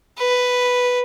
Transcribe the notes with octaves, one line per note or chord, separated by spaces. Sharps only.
B4